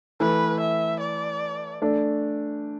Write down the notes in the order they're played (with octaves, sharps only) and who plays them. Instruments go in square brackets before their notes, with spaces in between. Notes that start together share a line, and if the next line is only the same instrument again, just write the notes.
[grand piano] E3 A3 [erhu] B4
[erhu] E5
D5
[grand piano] A3 D4